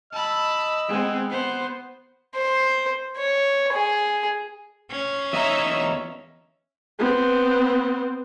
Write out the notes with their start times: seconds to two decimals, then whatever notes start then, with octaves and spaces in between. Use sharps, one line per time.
0.13 D#5 A5 B5 E6
0.89 G#3 B3 C4
1.30 B3 C5
2.35 C5
3.17 C#5
3.73 G#4
4.91 C#4
5.33 E2 C#5 D#5 E5 A#5 E6
6.99 B3 C4